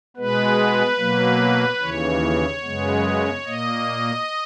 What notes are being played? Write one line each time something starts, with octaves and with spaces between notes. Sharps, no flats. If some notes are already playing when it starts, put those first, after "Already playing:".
B2 G#3 B3 B4
B2 F#3 A#3
D#2 C#3 E3 C#5
F#2 C#3 G#3 B3
A#2 A#3 D#5